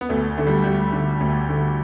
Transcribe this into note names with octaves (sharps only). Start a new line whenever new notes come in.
B3
D2 A3
D3 A3
G3
D2 G3
D3
D2
D3